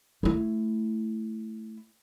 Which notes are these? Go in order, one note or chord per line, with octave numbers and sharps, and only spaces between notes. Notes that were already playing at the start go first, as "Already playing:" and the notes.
A3 E4